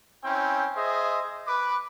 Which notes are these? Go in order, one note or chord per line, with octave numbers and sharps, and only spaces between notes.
C4 C#4 E4 G5
G#4 C5 D#5 E5
B4 D6